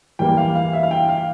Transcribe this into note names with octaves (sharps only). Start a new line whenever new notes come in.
E2 E3 G3 A#3 G5
F5
F5
E5
F5
G5
F5